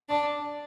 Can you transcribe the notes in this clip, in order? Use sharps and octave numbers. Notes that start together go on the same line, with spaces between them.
D4 D5